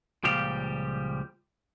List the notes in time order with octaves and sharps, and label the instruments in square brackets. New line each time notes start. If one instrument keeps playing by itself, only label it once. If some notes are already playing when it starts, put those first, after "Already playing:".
[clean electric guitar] C#2 A#2 F3 G3 G4 F5